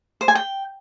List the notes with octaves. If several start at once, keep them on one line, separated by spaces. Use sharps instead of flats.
C5
G#5
G5